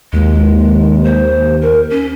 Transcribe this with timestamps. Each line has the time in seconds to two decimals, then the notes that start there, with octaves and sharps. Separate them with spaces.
0.13 D#2 G#3
1.04 C5
1.61 A#4
1.90 C#4